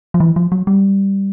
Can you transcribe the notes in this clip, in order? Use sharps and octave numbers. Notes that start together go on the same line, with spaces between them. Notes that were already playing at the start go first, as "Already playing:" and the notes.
F3
E3
F3
F#3
G3